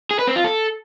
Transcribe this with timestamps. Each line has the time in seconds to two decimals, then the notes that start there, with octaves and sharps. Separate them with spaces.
0.11 G#4
0.19 B4
0.27 C4
0.36 F4
0.44 A4